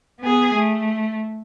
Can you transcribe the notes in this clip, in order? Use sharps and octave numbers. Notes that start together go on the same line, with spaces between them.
B3 G#4
A3